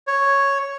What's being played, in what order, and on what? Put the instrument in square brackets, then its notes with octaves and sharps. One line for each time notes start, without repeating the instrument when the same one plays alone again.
[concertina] C#5